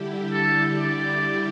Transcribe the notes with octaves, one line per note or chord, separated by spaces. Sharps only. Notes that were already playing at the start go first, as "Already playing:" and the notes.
Already playing: D3 G3 E4 G4
A4
D5